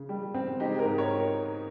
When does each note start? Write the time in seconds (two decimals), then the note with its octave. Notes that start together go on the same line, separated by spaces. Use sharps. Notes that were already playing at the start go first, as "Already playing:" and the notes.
Already playing: C#3
0.09 G3
0.34 C4
0.60 G#3 D#4 G4
0.79 G4 A#4
0.85 G#2
0.98 A#4 C#5